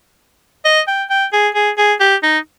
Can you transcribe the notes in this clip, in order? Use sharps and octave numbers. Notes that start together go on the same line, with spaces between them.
D#5
G5
G5
G#4
G#4
G#4
G4
D#4